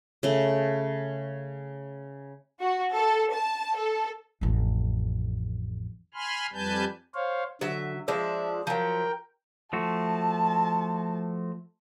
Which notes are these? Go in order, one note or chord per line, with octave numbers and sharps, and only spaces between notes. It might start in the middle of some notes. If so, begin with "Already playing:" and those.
C#3 A3
F#4
A4
A5
A4
A1 F2
G#5 B5 C6 F6
F2 G3 B4 G#5 A5 G6
C5 C#5 F5
D3 F#3 E5
F3 G#3 D4 E5
F3 F#3 A#4 G5
F3 A3 F#4 A5